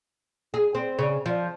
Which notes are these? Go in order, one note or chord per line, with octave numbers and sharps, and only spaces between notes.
G#4
C4
C#3
F3